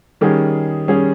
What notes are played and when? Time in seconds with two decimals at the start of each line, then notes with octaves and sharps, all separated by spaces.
0.21 D#3 G3 C#4 G#4
0.88 G3 C#4 G#4